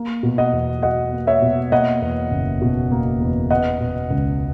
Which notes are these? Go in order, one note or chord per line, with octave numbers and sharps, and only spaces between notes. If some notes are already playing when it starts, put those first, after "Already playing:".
Already playing: A#3
B2
D#5 F#5
E2
F#3 D#5 F#5
A#3
C#5 E5
B2
A#3 D#5 F#5
E2
F#1
B2
A#3
E2
B3 D#5 F#5
B2
C#2